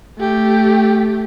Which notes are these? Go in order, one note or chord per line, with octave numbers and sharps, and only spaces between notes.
A3 G4